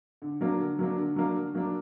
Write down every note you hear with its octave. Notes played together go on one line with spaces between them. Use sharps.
D3
F#3 A#3 D4
D3
F#3 A#3 D4
D3
F#3 A#3 D4
D3
F#3 A#3 D4